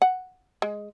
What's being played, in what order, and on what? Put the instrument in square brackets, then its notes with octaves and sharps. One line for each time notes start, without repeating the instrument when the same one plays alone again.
[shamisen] F#5
G#3